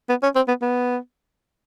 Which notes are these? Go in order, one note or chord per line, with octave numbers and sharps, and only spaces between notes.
B3
C#4
C4
B3
B3